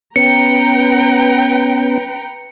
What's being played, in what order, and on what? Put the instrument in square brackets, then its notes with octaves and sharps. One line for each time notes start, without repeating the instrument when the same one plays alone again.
[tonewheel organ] B3 C#4 [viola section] B4 G5 A#5 [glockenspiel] C#7